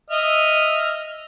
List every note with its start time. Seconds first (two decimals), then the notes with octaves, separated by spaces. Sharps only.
0.10 D#5 E5 F6